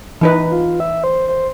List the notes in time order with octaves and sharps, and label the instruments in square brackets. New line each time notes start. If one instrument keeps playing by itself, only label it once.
[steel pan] E3 D#4 B4
[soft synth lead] F4
E5
C5
C5